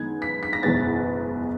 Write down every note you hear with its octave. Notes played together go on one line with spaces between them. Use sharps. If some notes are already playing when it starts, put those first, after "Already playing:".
Already playing: F#2 D#3 G#3 B3 D#4 G#6
B6
B6
A#6
F#1 E2 B2 G#3 B3 A6